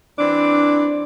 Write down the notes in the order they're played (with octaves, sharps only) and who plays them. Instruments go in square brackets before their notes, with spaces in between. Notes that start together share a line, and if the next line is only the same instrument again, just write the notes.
[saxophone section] E3 C4 D4